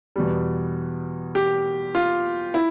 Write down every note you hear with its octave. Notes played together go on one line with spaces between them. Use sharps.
E2 B2 G3
G4
F4
E4